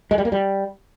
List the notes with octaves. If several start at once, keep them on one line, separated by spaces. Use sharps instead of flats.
G#3
G3
A#3
G3